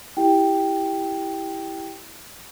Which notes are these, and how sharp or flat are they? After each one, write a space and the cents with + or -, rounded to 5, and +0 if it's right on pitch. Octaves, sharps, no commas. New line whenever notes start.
E4 -10 G4 +0 G5 +0